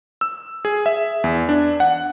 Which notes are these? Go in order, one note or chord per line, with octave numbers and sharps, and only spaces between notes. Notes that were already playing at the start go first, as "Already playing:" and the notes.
E6
G#4
E5
E2
D4
F#5